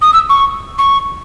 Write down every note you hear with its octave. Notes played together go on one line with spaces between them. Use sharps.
D#6
E6
C#6
C#6